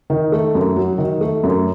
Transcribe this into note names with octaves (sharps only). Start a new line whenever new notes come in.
D#3
A3
F#2
F#3
D#3
A3
F#2